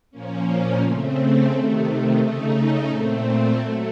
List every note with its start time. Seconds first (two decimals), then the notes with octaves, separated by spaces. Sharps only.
0.11 A#2 F3 A#3 C#4
0.80 C#3 A3 C4
1.50 C3 D#3 A3
2.19 C#3 A3 D#4
2.89 A#2 A3 C4
3.59 F#3 A3